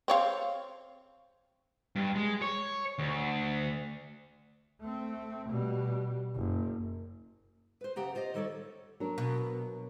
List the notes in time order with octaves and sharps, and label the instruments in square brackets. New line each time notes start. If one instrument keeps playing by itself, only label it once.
[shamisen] C4 C#5 F5
[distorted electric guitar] G2
G#3
C#5
D2
[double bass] A3 C4
B2 G3
F#1
[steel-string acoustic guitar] B4 C5
F#2 C#3 G4 F#5 A#5
F4 C5 D5 D#5
D#3 G3 A4 C#5 D5
[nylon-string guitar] F#3 D4 A#4
[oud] B2